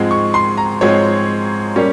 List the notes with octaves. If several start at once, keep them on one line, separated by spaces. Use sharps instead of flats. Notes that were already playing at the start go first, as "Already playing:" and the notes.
Already playing: G#2 F3 G#3 C4
C#6
C6
A#5
G#2 F3 G#3 C4 C#5
G3 A#3 C#4